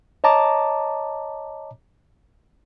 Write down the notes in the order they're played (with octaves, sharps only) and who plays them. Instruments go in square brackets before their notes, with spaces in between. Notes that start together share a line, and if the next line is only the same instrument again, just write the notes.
[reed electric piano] C#5 D#5 A5 A#5 D6